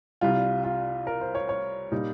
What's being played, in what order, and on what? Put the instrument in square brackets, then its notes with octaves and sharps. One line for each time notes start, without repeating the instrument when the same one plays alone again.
[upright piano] C2 C3 G3 F4
F4
A#4
C5
C#5
C#5
A#2 G3 D#4